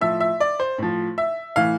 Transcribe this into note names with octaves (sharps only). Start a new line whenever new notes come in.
A2 F3 E5
E5
D5
C5
A2 F3
E5
A2 E3 F5